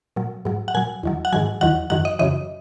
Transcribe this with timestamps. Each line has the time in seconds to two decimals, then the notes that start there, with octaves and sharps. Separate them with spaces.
0.16 A#2 F#3
0.45 G#2 F#3
0.68 F#5
0.74 A#2 F#3 G#5
1.03 E2 D#3 F#3
1.25 F#5
1.33 G#2 D#3 F#3 G#5
1.61 E2 D#3 F#3 F#5
1.90 F#2 D#3 F#3 F#5
2.05 D#5
2.19 F#2 C#3 E3 D#5